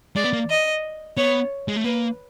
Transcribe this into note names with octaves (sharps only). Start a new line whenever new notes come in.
G#3 D5
B3
A#3
D#5
B3 C#5
G#3
A3
A#3 B4